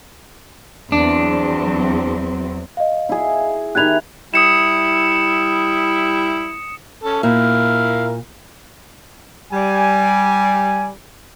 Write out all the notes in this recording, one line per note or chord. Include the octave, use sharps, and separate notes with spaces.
E2 F#3 C4 D4
D#5 F5
E4 G#4
D#3 E4 G4 F#6 G#6 F7
G3 E4 D#6 C#7 E7
C#4 A4
A#2 E4 A#4 F5
G3 G#5